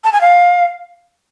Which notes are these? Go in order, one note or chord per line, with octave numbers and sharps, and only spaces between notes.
A5
G#5
F5